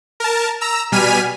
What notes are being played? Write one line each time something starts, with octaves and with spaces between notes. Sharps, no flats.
A#4 A5
A#5 E6
B2 G3 G#5 F6 B6 D#7